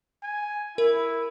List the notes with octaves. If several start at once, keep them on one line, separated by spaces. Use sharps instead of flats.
G#5
E4 A#4